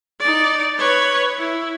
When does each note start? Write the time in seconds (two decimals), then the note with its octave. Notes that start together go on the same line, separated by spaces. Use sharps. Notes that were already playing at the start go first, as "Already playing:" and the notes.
0.20 D#4 D5
0.78 B4 C#5
1.37 E4